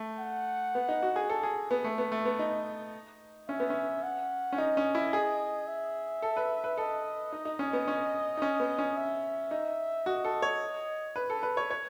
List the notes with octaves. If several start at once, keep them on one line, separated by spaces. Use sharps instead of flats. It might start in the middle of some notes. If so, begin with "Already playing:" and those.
Already playing: A3
F#5
B3
D#4
F#4
G#4
A4
G#4
B3
A3
B3
A3
B3
D#4
C#4 E5
B3
C#4
F#5
C#4
D#4 D#5
C#4
E4
G#4
E5
A4
B4
B4
A4 D#5
D#4
D#4
C#4
B3
C#4
D#4
C#4
B3
C#4
E5
D#4
F#4 D#5
A4
C#5
B4
A4
B4
C#5
C#5